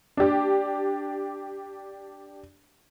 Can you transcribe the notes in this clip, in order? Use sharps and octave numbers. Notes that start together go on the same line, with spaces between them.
D4 G4